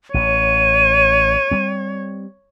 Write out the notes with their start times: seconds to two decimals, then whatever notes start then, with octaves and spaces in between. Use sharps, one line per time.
0.14 A1 C#5 D#7
1.51 G3 C4